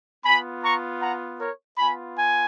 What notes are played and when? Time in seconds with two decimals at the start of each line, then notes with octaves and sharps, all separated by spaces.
0.25 B3 F4 G#5 B5
0.64 A#5 C#6
1.01 F#5 A#5
1.40 A#4 C#5
1.78 B3 F4 G#5 B5
2.17 G#5